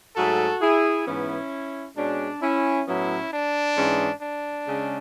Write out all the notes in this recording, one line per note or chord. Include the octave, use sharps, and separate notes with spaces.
G#2 F#3 A3 F#4 A4
E4 G#4
G#2 E3 B3 C#4 E4
B2 G#3 C#4 D4
C#4 E4
A2 F#3 B3 C#4 E4
D4
G#2 E3 G#3 C#4
D4
C#3 G#3 C#4